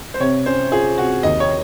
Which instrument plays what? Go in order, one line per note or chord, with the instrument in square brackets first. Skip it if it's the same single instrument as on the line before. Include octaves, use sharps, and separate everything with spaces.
[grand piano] C5
[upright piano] C3 [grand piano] C#5
[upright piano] C#4 [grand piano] C5
[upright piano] F4 [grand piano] G#4
[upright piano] C3 [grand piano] F#4
[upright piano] D#2 [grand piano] D#5
[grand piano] C#5